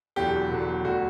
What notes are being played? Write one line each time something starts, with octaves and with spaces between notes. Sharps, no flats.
E1 E2 D3 F#3 G4
E1 E2 D3 F#3
D2 D3 F#3 F#4